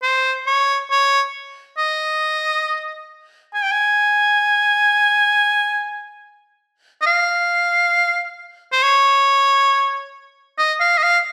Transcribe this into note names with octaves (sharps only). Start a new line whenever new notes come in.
C5
C#5
C#5
D#5
G#5
G5
G#5
D#5
F5
C5
C#5
D#5
F5
D#5
F5